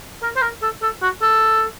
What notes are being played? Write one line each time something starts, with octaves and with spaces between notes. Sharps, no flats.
A#4
C5
A#4
A4
A4
F#4
A4